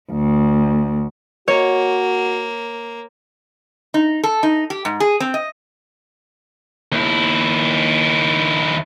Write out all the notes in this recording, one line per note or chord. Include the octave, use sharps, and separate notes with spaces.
D2
A#3 F#4 C#5
D#4
A4
D#4
G4
G#2
G#4
C4
D#5
D#2 E4